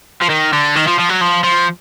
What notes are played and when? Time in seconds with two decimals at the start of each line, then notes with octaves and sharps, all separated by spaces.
0.22 F3
0.29 D#3
0.53 D3
0.75 D#3
0.87 F3
0.99 F3
1.09 F#3
1.21 F3
1.44 F3